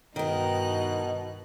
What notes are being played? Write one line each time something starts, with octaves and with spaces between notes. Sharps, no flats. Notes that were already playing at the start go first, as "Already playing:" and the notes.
G2 B2 D#3 D#4 A#4 F#6